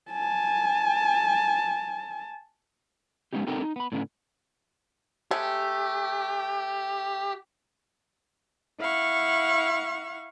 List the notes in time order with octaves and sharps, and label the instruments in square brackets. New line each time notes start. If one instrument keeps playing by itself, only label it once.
[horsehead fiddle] G#5 A5
[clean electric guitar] G#3 B3 C#4 D#4 G4
B3 C4 D#4 G4 A4 A#4
D#4
B3 B5
A2 D3 B3 C#4
[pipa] C3 G#3 A3 [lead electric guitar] G4
[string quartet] E4 F5 F#5 C#6